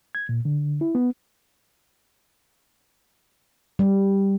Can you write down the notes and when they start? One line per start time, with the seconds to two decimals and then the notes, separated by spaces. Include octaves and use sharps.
0.15 G#6
0.29 A#2
0.45 D3
0.81 E4
0.95 B3
3.79 G3